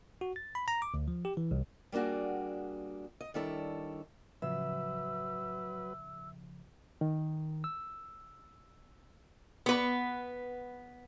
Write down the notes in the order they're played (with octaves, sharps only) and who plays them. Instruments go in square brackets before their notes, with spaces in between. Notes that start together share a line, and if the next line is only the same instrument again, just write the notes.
[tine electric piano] F#4
A6
B5
A#5
D6
D2
F3
G4
E3
C2
[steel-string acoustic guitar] G3 A#3 D4 F#4 G#4
D#5
D#3 G3 D4 E4 A4 C#5
[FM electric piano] A2 C#3 F3 [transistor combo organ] F#3 B4 [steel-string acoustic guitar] E5 [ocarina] E6
[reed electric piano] D#3
E6
[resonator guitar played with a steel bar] B3 B4